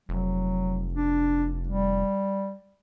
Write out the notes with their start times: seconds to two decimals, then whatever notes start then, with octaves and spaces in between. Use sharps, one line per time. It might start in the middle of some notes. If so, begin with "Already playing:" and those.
0.09 F1 F#3
0.94 D4
1.69 G3